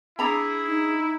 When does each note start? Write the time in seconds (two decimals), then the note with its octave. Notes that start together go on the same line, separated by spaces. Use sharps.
0.19 D4 E4 G#4 A#5 B5
0.67 D#4